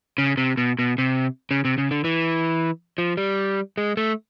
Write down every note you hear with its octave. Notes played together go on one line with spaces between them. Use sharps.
C#3
C3
B2
B2
C3
C#3
C3
C#3
D3
E3
F3
G3
G#3
A3